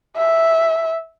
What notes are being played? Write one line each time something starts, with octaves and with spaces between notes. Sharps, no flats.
E5